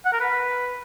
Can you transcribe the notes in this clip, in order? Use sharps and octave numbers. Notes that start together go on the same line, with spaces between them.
F#5
A#4
B4